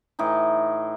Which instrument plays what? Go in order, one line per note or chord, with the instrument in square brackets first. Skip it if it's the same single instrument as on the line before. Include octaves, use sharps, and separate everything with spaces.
[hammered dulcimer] A2 E3 D#4